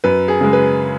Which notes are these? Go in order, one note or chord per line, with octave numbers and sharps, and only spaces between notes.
F#2 B4
G#4
C#3 G#3
B4